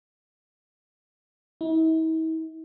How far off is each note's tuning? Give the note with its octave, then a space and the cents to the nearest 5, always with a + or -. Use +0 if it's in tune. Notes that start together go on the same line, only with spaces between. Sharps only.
E4 -45